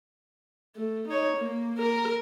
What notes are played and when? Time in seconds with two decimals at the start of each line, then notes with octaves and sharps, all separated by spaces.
0.76 A3
1.08 D#4 C#5
1.38 A#3
1.78 A#4